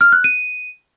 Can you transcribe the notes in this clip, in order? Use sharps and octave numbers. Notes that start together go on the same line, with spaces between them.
F6
F#6
D#7